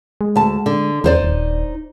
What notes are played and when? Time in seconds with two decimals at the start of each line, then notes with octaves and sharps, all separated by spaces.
0.21 G#3
0.35 D2 A5
0.66 D3
1.04 E2 D#4 C5 D5
1.22 D#1